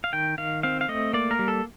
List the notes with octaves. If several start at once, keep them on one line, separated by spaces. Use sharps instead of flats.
F5
D#3 G5
D#3 F5
C4 F5
F5
A3 D#5
A#3 D5
A#4
G3
A4